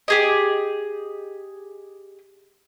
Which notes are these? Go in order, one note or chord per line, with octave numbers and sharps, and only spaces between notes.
G4 G#4 D#5